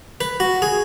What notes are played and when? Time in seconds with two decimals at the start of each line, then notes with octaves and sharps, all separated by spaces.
0.21 B4
0.40 F#4
0.62 G#4